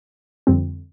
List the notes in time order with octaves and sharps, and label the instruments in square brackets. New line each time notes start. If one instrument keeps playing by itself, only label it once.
[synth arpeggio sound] F2 D3 G3 C4